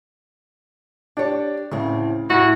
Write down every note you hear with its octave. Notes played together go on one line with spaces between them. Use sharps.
D4 G4 C#5
D2 A2 C#3 C4
A2 G3 E4 F#4 A#6